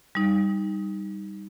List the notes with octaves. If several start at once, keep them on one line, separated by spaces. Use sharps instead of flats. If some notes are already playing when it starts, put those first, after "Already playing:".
G3 D#4